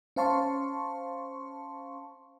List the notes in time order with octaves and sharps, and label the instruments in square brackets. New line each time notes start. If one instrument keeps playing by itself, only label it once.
[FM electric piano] C#4 C5 F5 A5 C6 C#6